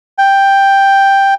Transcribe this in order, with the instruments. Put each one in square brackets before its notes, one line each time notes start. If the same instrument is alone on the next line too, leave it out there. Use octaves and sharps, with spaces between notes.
[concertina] G5